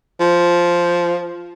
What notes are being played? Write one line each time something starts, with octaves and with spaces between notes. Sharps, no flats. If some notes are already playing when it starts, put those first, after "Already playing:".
F3